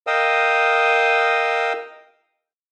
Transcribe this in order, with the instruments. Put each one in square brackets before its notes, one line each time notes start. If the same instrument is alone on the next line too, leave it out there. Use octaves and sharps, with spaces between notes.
[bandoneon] A#4 D#5 F5 G5 D#6 E6